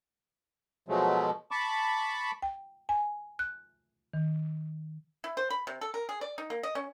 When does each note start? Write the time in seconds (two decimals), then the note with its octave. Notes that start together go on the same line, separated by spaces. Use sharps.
0.89 B2 F3 F#3 G#3 A3
1.51 A5 B5 C#6 D6
2.42 G5
2.89 G#5
3.39 F#6
4.13 D#3
5.24 E4
5.37 C5
5.50 B5
5.67 C3
5.81 A4
5.94 A#4
6.09 G#4
6.21 D5
6.38 D#4
6.50 A#3
6.63 D#5
6.75 C#4